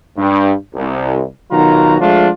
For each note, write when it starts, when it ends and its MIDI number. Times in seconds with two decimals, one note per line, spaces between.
0.17 0.53 43
0.75 1.24 36
1.51 1.96 35
1.51 1.96 51
1.51 1.96 54
1.51 1.96 65
1.51 1.96 66
1.51 1.96 82
2.01 2.30 53
2.01 2.30 56
2.01 2.30 57
2.01 2.30 62
2.01 2.30 65